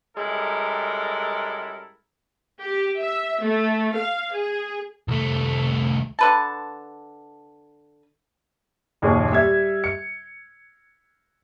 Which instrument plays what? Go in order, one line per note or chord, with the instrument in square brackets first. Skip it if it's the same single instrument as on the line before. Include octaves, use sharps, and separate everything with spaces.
[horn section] F#2 G3 G#3 E4 A4 A#4
[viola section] G4
E5
A3
F5
G#4
[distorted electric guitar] C2 A3
[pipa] D3 B4 A5
[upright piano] F#1 D#2 A#2 G#4
G3 E5 G#6
C#7